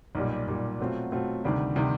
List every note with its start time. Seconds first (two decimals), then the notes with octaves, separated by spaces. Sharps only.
0.15 B1 A#2 G3
0.48 B1 A#2 G3
0.79 B2 F#3 A3 C4 F4
1.12 B2 F#3 A3 C4 F4
1.44 D2 C3 D#3 G3
1.76 C3 D#3 G3